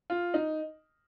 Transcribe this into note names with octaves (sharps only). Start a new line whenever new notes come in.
F4
D#4